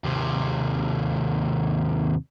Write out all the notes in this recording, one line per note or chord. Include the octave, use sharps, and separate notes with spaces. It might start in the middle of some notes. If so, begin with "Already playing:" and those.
D#2 C3